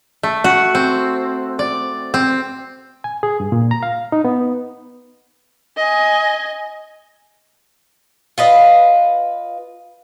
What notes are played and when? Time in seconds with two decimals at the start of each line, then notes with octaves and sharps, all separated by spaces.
0.23 A3
0.44 F#4
0.75 C4
1.59 D5
2.14 C4
3.04 G#5
3.23 G#4
3.40 G2
3.52 A#2
3.71 A#5
3.83 F5
4.12 D#4
4.25 B3
5.77 D#5 G#5
8.38 F4 B4 D#5 F5